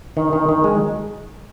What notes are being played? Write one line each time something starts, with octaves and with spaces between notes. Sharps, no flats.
D#3
D#3
D#3
G#3